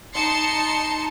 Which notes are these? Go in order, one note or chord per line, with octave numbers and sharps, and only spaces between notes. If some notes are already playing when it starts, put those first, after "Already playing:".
D#4 A5 C6 C#7